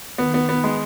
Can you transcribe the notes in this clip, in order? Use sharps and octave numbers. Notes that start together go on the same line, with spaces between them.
D#3 B3
B3
B3
G#3